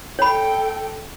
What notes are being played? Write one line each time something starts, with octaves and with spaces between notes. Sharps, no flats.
A4 C#5 G5 B5